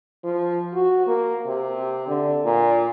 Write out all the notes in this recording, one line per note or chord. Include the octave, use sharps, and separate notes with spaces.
F3
F#4
A#3
C3
D3
A#2